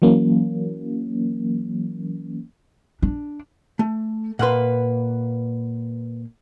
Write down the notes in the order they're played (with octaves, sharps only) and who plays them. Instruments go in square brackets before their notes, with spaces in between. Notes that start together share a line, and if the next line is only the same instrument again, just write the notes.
[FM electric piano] E3 F#3 A#3 C#4
[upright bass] D4
[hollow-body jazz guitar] A3
[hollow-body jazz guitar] A#2 A#3 C6 [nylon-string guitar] B4 F#5